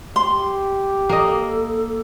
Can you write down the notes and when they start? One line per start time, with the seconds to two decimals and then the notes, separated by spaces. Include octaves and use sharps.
0.16 G4 C6
1.09 A#3 A4 D#5